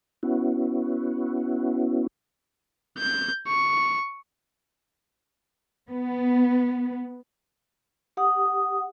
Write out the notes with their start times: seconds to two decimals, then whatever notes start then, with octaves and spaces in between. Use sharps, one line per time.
0.23 B3 C#4 E4 F#4
2.98 G6
3.48 C#6
5.90 B3
8.17 G4 F#5 D#6